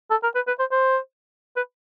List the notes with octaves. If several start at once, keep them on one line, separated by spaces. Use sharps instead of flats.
A4
A#4
B4
B4
C5
C5
B4